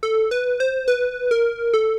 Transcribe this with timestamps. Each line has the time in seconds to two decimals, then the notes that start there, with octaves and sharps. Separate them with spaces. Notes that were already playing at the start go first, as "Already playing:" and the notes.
0.03 A4
0.31 B4
0.60 C5
0.88 B4
1.31 A#4
1.74 A4